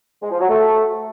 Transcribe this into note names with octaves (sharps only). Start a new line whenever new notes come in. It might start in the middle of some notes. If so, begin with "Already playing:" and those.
G#3
F3
F#3
A3